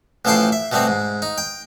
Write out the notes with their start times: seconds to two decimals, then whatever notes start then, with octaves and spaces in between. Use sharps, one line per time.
0.25 A1 E3 F3 A4 G5 C6
0.52 E5
0.72 B2 G3 A3 B3 C4
0.87 G#2
1.22 D#4
1.38 G5